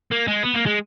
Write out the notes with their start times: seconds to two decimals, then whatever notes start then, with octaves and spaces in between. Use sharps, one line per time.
0.12 A#3
0.28 G#3
0.43 B3
0.54 A#3
0.66 G#3